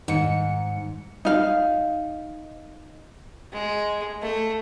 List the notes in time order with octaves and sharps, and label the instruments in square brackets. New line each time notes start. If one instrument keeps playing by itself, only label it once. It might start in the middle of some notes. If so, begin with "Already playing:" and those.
[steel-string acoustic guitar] G#2 [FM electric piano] D#3 C#7
[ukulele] D#4 F5
[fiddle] G#3
A3